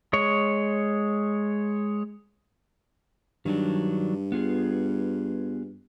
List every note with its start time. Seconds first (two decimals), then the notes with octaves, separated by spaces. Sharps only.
0.13 G#3 C#5
3.46 G2 D#3 F#3 D4
4.32 B3 F4 G#4